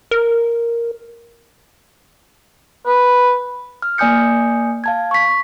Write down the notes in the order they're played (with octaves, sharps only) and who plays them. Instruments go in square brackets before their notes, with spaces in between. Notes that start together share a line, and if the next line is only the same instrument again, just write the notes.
[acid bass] A#4
[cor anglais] B4
[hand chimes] F6
A#3 D5 G#5 D#6 G6 C#7
F5 A5 G#6
C#6 B6